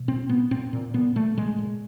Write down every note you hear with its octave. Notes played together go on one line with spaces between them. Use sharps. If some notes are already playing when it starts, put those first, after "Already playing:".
Already playing: B2
A#2 C4
A#2 B3
A#2 C4
A#2
A#2 B3
A#2 A3
A#2 G#3
A#2